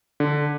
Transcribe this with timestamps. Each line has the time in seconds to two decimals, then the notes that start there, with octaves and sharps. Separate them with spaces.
0.20 D3